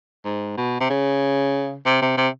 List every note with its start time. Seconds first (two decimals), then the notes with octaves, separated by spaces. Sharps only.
0.25 G#2
0.57 B2
0.80 C3
0.90 C#3
1.85 C3
2.02 C3
2.17 C3